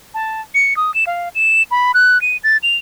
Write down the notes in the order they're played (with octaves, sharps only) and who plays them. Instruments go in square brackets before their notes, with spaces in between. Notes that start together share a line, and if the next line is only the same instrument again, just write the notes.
[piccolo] A5
C#7
D#6
E7
F5
E7
B5
F#6
D#7
A6
F7